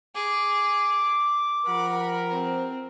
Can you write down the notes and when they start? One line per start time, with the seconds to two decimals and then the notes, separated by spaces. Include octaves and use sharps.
0.15 G#4 D6
1.66 F3 G4 A#4 F#5 B5
2.30 C4